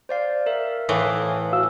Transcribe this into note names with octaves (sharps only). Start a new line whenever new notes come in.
C5 D5 F5
A#4 E5
A2 E3 F5 D6 D#6
F#4 F5 E6